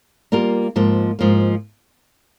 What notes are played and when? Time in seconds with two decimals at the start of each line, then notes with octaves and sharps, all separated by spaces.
0.32 G3 A#3 F4 A#4
0.76 G#2 F3 A#3
1.19 G#2 F3 A#3